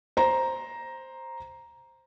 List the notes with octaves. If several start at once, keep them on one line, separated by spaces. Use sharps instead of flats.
C5 A#5